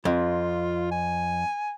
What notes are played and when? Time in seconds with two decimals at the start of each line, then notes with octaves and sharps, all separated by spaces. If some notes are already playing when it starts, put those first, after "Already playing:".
0.05 F2 F4
0.91 G#5